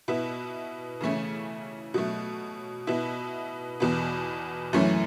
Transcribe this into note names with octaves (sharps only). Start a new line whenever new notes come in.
B2 B3 E4
C#3 E3 A3 C#4 E4
B2 F#3 A3
B2 B3 E4
E2 B2 B3
F#2 E3 A3 C#4